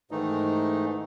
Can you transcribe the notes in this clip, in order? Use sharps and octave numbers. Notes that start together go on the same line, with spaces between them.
G#2 D#3 E3 A3 D#4